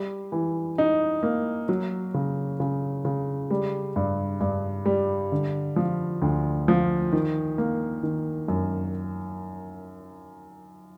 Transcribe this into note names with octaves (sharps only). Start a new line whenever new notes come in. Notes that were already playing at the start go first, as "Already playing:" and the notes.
Already playing: G3
E3
D#4
A#3
F#3
C#3
C#3
C#3
G3
G2
G2
G3
D3
F3
D2
F3
D#3
A#3
D#3
F#2